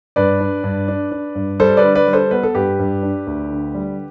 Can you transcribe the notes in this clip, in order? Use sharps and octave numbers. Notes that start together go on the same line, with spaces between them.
G2 B4 D5
D4
G2
D4
D4
G2
G3 A4 C5
B4 D5
D3
B4 D5
G3
A4 C5
B3 B4
A4
G2 G4 B4
G2
D4
D2
D3
G3